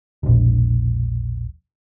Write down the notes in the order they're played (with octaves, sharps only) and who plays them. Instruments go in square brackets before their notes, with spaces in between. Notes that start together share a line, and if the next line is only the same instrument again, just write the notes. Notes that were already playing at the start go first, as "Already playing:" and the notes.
[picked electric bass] E1 A#1